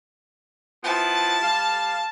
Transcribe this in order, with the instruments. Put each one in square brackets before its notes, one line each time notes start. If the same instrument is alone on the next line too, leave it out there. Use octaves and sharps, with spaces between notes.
[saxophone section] F3 B3 E4 [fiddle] A5
[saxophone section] G3 F5